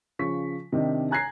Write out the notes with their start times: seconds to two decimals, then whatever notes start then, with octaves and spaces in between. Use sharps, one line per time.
0.19 C#3 F3 C#6 B6
0.72 C3 D#3 D4 D#4
1.11 G#5 A#5 F#6 G#6 A#6 C7